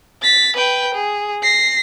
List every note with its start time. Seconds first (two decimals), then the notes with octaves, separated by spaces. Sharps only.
0.23 A6 B6
0.56 B4 G5
0.94 G#4
1.43 A#6 C7